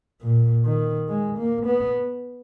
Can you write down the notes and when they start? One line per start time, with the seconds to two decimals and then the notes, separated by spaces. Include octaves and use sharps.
0.22 A#2
0.65 D#3
1.09 G#3
1.38 A#3
1.66 B3